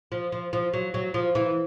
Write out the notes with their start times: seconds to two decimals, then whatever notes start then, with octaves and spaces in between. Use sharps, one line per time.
0.12 F3
0.32 F3
0.53 F3
0.73 F#3
0.94 F#3
1.14 F3
1.35 E3